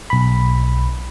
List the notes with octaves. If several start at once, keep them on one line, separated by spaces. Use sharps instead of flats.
B1 B5